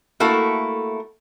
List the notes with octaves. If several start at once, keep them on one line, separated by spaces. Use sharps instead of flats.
A3 A#3 E4 F#4 A4